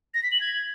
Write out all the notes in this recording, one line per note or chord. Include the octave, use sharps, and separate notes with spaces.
A#6
B6
F#7
G#6